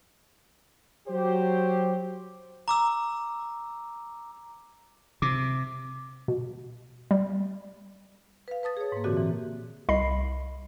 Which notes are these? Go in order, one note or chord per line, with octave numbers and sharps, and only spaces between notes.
F#3 G4 C5
A#5 D6 E6
C3 D6
B2
G3
B4 F5
B4 A5 D#6 A6
G#4 C#5
G#2 A#3
A#2 D3 E3 C4 F#4 G4
E3
C2 D#5 B5 C7